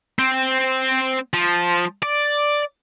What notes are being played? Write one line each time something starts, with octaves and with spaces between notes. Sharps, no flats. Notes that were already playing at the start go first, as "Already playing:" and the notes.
C4
F3
D5